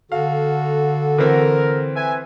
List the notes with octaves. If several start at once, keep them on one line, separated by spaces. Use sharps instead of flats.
D3 F#4 A4 F5
E3 C4 A#4
B4 E5 G#5